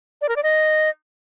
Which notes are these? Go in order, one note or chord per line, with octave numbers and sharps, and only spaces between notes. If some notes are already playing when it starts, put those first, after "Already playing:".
D5
A#4
D5
D#5